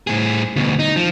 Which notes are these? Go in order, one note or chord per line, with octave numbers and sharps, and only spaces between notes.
A2 G#4
D2 B2
D#4
F3